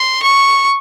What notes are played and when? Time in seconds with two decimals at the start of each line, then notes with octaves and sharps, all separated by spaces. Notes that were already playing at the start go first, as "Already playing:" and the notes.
Already playing: C6
0.22 C#6